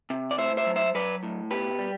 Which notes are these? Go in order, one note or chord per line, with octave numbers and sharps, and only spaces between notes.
C3
D5
A2 C5 E5
C5 E5
F#3
C5 E5
F#3 B4 D5
A2
B2 G4 B4
G3